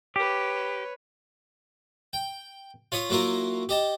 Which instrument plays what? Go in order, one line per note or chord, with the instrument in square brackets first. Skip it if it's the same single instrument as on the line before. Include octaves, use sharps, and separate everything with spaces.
[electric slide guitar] G4 [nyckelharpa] B4 C#5
[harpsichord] G5
F4 C#5 B5 D#6
F#3 A#3 E4 F4 A#4
G4 D#5 A5